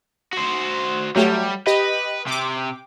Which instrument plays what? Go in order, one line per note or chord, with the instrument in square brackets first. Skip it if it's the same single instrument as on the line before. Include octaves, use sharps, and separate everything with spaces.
[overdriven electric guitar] F#4 C5
[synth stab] F#3 A3 G4 [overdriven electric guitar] G3
[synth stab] G4 D#5 [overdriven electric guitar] B4
[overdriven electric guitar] C3 [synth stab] G5 D6